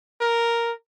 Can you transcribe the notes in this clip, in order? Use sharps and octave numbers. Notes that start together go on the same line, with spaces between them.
A#4